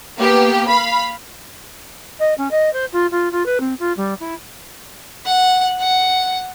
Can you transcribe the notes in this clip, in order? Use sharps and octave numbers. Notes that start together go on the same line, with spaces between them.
A#3 B3 G4
F5 B5
D#5
C#4
D#5
C5
F4
F4
F4
B4
C4
F4
G3
E4
F#5
F#5